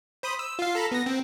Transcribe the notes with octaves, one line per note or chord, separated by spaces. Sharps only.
C5 B5 D#6
E6
F4 F5
A4 A#5 B5
B3 A#6
C4